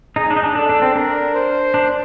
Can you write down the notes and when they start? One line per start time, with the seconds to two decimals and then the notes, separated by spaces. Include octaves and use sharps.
0.16 D#4 G#4
0.30 D4
0.37 D#4
0.43 D4
0.55 D4 A4
0.69 D4
0.82 C4
0.96 D4 A#4
1.35 C5
1.74 D4